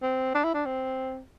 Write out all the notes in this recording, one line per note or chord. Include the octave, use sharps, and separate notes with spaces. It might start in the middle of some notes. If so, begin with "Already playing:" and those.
C4
D4
E4
D4
C4